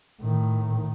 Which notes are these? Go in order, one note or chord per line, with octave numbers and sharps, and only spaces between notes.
A2 D#3